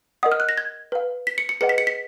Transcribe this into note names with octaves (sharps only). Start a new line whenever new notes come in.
A#4 D#5 F#5 D#6
F6
F#6
A#6
G#6
B4 F5
B6
C#7
C#7
G#4 B4 D#5 F#5 C#7
B6
C#7
B6